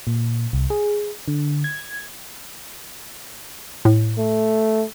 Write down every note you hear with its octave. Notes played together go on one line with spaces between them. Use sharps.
A#2
C2
G#4
D3
G#6
A2
A3